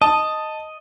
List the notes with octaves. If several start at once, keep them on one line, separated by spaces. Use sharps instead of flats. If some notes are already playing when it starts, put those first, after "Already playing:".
D#5 A5